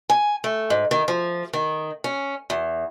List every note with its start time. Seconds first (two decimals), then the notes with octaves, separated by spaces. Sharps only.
0.10 G#5
0.44 A3
0.70 G#2
0.91 D#3
1.08 F3
1.53 D#3
2.04 C#4
2.50 E2